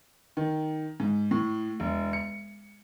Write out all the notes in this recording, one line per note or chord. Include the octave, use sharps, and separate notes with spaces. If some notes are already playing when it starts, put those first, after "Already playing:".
D#3
G#2
A2
E1
C#7